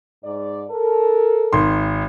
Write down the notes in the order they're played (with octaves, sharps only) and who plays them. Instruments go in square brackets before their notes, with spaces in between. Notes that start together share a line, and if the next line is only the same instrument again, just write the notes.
[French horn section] G#2 D5
A4 A#4
[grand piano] G#1 D#3 C6